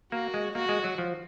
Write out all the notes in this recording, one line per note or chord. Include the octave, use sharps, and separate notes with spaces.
A#3 F#4
G#3
A#3 F#4
G#3
F#3
F3